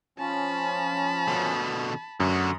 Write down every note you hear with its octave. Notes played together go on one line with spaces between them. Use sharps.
F3 C#4 A5 B5
B2 D3
F#2 D3 F#4 D#6